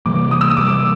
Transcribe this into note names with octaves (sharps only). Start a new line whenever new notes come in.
C3 E3 G3 A#3 D6
D#6
E6
D#6
C3 E3 G3 A#3 D6